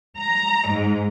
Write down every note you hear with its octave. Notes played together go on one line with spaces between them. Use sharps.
A#5
G#2